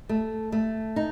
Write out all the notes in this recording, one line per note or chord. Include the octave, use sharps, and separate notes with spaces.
A3
A3
D#4